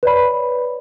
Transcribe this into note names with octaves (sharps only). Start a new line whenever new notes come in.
B4 C#5 D5 B5